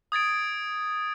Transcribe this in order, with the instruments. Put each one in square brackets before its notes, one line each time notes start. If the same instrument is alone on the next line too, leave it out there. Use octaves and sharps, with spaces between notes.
[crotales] D#6 G#6 A6 D7